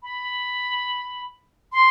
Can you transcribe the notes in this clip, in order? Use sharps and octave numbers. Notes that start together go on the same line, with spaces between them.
B5
C6